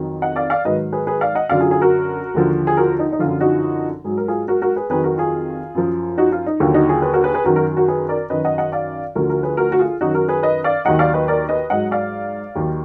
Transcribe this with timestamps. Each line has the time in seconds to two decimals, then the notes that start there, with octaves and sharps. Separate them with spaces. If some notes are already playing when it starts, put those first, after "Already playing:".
Already playing: F2 D#3 F#3
0.22 D#5 F#5
0.36 D5 F5
0.50 D5 F5
0.65 G#2 D#3 F#3 B4 D#5
0.92 G#4 B4
1.07 G#4 B4
1.21 D5 F5
1.35 D#5 F#5
1.49 F#2 D3 F#3 D5 F5
1.60 F4 G#4
1.71 F4 G#4
1.81 F#4 A#4
2.34 D#2 D3 F3
2.67 G#4
2.77 F#4 A#4
2.99 D#4
3.12 D#4
3.19 F#2 D3 F3 F4
3.41 D#4 F#4
4.04 G#2 F#3 G#4
4.17 A#4
4.28 F4 G#4
4.48 F#4 A#4
4.62 F#4 A#4
4.76 G#4 B4
4.89 F2 D#3 F#3 G#4 B4
5.04 F#4 A#4
5.18 F4 G#4
5.75 F#2 F3
6.18 D#4 F#4
6.32 F4
6.46 D#4
6.60 D#2 D3 F#3 F4
6.74 D#4 F#4
6.89 F4 G#4
7.02 G#4 B4
7.13 F#4 A#4
7.24 G#4 B4
7.34 G#4 B4
7.45 F#2 D#3 F#3 F#4 A#4
7.56 F#4 A#4
7.77 F#4 A#4
7.88 G#4 B4
8.09 A#4 D5
8.30 F#2 D#3 F#3 B4 D#5
8.45 D#5 F#5
8.58 D#5 F#5
8.72 D5 F5
9.15 D2 D3 F3 F#4 A#4
9.29 F#4 A#4
9.43 G#4 B4
9.57 F#4 A#4
9.72 F#4
9.79 F4 G#4
10.01 F#2 D#3 F#3 D#4 F#4
10.15 F#4 A#4
10.28 G#4 B4
10.43 B4 D#5
10.64 D5 F5
10.85 D#2 D#3 F#3 D#5 F#5
10.99 D5 F5
11.14 B4 D#5
11.28 A#4 D5
11.49 B4 D#5
11.70 G#2 F#3 D#5 F#5
11.91 D5 F5
12.55 D#2 D#3 F#3